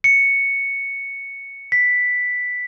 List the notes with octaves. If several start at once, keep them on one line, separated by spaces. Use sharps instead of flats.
C#7
B6